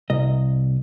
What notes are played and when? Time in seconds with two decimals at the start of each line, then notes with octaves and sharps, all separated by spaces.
0.10 C2 D#5